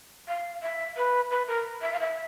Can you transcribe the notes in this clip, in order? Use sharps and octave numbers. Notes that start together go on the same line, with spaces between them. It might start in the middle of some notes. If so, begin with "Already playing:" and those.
F5
E5
B4
B4
A#4
E5
F5
E5